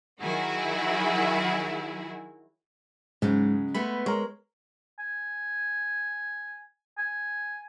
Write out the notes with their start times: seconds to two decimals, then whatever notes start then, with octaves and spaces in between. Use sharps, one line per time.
0.21 D#3 F#3 E4 F#4 G#4
3.22 G#2 C#3 F#3 G#3
3.74 G#3 A3 B3 B5
4.06 G#3 A#4 C#5
4.99 G#5
6.98 G#5